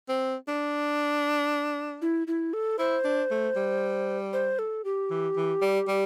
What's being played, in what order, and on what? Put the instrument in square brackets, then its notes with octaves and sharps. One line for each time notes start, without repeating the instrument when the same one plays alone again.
[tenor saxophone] C4
D4
[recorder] E4
E4
A4
[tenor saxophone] E4 [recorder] C5
[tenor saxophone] D4
A3
G3
[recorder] C5
A4
G4
[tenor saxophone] E3
E3
G3
G3